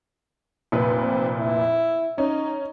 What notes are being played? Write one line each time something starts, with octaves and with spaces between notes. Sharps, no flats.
F1 A#2 B4
C4
E4
C#4 D#4